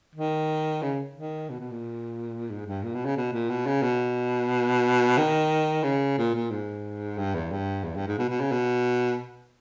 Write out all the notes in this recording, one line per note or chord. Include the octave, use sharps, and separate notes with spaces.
D#3
C#3
D#3
B2
B2
A#2
G#2
G2
A#2
B2
C#3
B2
A#2
B2
C#3
B2
D#3
C#3
A#2
A#2
G#2
G2
E2
G2
E2
G2
G#2
B2
B2
C#3
B2